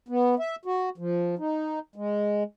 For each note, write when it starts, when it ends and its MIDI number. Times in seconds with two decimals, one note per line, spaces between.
0.08 0.35 59
0.39 0.56 76
0.65 0.89 66
0.98 1.35 53
1.39 1.79 63
1.96 2.43 56